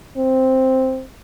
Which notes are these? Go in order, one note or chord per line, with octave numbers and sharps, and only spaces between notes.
C4